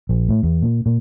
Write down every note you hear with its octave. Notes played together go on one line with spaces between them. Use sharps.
A#1
A2
E2
A#2
A#2